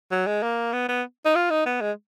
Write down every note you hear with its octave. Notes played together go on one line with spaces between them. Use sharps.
F#3
G#3
A#3
B3
B3
D#4
F4
D#4
B3
G#3